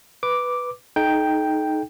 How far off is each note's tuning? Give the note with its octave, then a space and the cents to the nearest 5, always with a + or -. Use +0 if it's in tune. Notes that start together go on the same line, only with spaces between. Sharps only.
B4 +0 D6 +0
D#4 +0 A4 -40 G5 +0